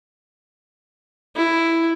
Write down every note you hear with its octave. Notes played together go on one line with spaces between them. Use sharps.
E4